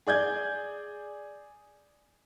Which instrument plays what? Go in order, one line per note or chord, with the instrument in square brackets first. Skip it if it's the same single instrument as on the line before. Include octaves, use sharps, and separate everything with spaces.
[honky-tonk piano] G#4 D5 G6 G#6